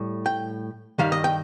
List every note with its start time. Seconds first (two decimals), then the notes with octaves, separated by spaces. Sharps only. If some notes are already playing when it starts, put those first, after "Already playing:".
Already playing: A2 G3
0.26 G5
0.98 G2 D#3 G3 F5
1.12 D#5
1.24 G5